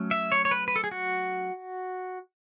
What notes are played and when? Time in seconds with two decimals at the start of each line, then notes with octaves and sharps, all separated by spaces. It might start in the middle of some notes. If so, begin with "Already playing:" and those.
Already playing: F#3 A3 C#4
0.11 E5
0.32 C#5
0.45 C#5
0.51 B4
0.68 B4
0.76 A4
0.84 G#4
0.91 F#4